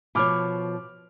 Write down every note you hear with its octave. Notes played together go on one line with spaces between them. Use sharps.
B2 F3 C#5 B5 D6 F6